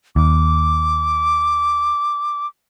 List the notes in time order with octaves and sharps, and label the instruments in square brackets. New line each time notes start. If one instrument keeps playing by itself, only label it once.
[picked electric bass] D#2 [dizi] D6